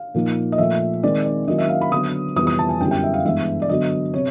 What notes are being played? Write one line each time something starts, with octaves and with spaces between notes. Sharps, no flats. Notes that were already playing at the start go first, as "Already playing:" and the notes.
Already playing: F5
A#2 F3 A#3 D#4
D#5
A#2 F3 A3 E5
D#3 G#3 C4 D5
D5
D#3 F#3 A#3 C#4 E4 D#5
E5
F5
B5
D3 F#3 B3 D#6
F2 C3 E3 G3 B3 D#6
D#6
A5
G#5
F#2 D3 G3 B3 E4 G5
G5
E5
F5
G2 E3 G#3 B3 E5
D5
D3 F#3 B3 D#5
C3 C#5